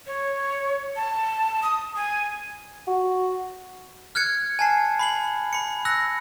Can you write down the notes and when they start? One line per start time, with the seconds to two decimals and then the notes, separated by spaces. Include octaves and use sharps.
0.07 C#5
0.96 A5
1.63 D#6
1.96 G#5
2.87 F#4
4.15 F6 F#6 G#6 C#7
4.59 G#5 A5 C7
4.99 B5 C7 F#7
5.53 B5 C#7
5.85 E6 F#6 A#6